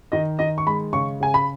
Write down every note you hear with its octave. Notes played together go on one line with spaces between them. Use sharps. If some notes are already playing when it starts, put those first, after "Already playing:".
D#3 D#5
D#3 D#5
C#6
G#3 B5
C#3 C#6
C#3 G#5
B5